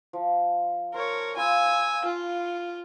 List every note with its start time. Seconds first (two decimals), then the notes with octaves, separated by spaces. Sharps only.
0.13 F3
0.94 A#4 C5 C#5
1.36 F4 G#5 B5 C6 E6
2.05 F4 G#5